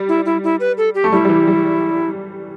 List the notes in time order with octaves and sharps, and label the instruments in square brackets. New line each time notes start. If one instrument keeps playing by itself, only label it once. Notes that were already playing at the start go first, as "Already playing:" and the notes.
Already playing: [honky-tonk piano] G3
[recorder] E4
E4
E4
B4
A4
G4
[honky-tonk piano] A3
[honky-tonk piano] G3 [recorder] E4
[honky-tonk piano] G3
E3
G3